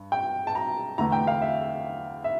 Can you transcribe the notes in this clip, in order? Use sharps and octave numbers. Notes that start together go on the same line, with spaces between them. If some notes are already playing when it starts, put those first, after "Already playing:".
Already playing: G2
G5
A5
A#5
E2 D3 A3 A#5
G5
F5
E5
E5